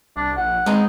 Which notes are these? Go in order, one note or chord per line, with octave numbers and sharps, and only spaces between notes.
C2 D4
A#1 F#5
G#3 B3 C4 D#4